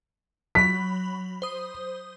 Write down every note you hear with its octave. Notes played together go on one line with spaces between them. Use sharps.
F#3 B5 B6
C5 D#6